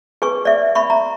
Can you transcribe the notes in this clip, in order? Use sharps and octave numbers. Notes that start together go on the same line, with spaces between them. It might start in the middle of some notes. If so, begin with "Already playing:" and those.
G#4 B4 G#5 C#6
D5 E5
E5 B5 C#6
A#5